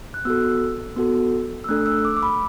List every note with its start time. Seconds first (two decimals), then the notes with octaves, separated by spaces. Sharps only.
0.14 F#6
0.25 B3 F#4 A4 E6
0.96 B3 F#4 A4
1.64 E6
1.69 A3 D4 A4 F#6
1.86 E6
2.05 D6
2.17 D6
2.23 B5